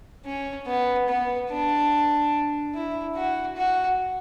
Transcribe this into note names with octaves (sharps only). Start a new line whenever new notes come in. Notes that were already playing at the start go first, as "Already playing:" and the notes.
C#4
B3
B3
D4
E4
F#4
F#4